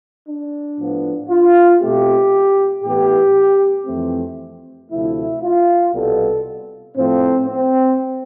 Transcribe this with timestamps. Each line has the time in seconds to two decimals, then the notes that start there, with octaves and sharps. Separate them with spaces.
0.27 D4
0.78 A2 F3 B3
1.30 F4
1.81 B2 A3 C4 G4
2.84 A2 E3 B3 G4
3.87 F2 E3 A3 C4
4.90 D2 C3 F3 A3 E4
5.43 F4
5.93 C2 B2 G3 B3 A4
6.96 A2 F3 A3 C4
7.47 C4